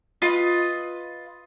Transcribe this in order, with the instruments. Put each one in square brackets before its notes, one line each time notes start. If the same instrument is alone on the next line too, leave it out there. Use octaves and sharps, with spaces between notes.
[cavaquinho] F4 B4 D#5